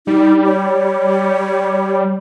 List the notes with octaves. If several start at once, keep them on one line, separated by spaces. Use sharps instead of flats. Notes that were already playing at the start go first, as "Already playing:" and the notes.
G3 D#4
C#5